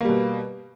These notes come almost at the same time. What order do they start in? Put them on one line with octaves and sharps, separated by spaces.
A#3 G3 B2